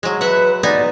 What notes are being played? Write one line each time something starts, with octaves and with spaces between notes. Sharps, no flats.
F#3 G#3
B4 E5 F#5
B3 D#4 D5 G#5